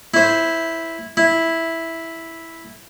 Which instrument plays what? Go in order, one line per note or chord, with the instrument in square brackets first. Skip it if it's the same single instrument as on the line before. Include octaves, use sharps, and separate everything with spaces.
[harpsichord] E4 C5
E4